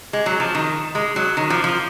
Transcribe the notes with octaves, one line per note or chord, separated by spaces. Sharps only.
G#3
F#3
F3
D#3
G#3
F#3
D#3
F3
F3